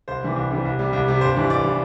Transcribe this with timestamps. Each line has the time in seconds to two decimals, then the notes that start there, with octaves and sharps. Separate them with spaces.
0.08 C2 C5
0.23 C3 E3 G3
0.36 C2
0.51 C3 E3 G3
0.65 C2
0.79 C3 G3
0.93 C2
1.08 C3 G3
1.21 G1 C5
1.36 G2 E3 G3
1.50 G1 D5
1.64 E3 G3